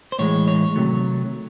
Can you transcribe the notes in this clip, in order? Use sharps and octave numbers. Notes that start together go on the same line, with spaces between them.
C5
A2 E3 G#3 C#5
C#5
C3 D#3 F#3 A3